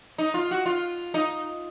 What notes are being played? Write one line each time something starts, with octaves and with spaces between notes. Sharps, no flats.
D#4
F4
F#4
F4
D#4